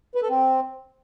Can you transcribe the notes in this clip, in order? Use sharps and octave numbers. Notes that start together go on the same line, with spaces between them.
B4
A4
C4